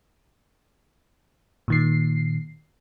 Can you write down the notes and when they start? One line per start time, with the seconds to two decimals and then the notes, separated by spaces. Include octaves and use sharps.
1.68 A#2 D#3 C7